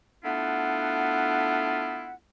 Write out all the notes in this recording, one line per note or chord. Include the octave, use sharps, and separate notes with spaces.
A3 B3 D4 E4 F4 F#5